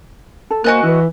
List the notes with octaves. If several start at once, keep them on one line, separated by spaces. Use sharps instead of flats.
A4
A#3 F#4 A#4 C5 D#5 G#5 F#6
E3 E4 B4